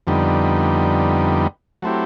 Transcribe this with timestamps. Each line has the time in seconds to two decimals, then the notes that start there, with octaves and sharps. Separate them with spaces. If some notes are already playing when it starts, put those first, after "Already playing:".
0.07 F2 D3 G3 B3 D#4
1.82 F#3 A3 C4 E4 G4